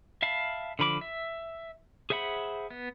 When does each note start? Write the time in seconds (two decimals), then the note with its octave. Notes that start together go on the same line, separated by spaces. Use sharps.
0.22 E5 F5 A5 B5
0.79 D3 F3 B5 D6
1.01 E5
2.10 G#4 C5 E5 F#5 B5
2.70 B3